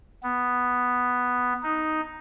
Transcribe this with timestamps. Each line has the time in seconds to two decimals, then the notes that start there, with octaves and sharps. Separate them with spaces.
0.23 B3
1.63 D#4